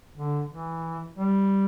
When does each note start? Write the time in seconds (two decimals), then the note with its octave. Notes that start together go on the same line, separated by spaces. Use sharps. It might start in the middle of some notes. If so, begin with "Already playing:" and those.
0.15 D3
0.49 E3
1.18 G3